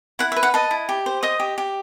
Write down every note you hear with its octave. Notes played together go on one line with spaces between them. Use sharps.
E4 F#5
E5
B4
F#5
D#5 A5
E4
G4
C5
D#5 D#6
G4
G4